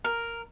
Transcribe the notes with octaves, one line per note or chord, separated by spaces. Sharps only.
A#4